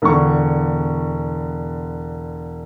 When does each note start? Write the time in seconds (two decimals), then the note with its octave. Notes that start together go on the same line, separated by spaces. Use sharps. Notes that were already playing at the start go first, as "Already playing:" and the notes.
0.02 E1 D3 C#6